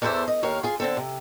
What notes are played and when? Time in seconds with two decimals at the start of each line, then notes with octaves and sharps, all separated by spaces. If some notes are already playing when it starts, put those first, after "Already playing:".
0.02 E2 E3 A4 C5 E5
0.28 D#5
0.43 D#2 A#4 C#5 F5
0.63 F4 G#4
0.80 D3 C4 A4
0.97 C3